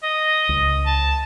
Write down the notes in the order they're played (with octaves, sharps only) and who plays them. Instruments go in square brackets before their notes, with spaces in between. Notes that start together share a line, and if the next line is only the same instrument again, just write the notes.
[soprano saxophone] D#5
[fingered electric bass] C#2
[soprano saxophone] A5